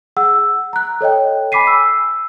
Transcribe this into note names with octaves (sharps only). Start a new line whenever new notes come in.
G#4 F#5 E6
A#5 F#6
A4 C#5 D#5 G5
G#5 B5 D6 B6 C7 D#7
E6